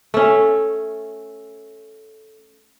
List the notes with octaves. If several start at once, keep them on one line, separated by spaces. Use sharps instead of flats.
A3 C#4